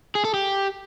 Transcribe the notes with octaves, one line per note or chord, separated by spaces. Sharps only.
G#4
A4
G4